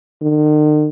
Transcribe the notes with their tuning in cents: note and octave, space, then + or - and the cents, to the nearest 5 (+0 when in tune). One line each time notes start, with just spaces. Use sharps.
D#3 -45